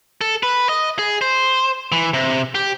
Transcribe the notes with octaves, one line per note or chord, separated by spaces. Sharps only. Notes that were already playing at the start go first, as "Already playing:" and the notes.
A4
B4
D#5
G#4
C5
E3
C3
G4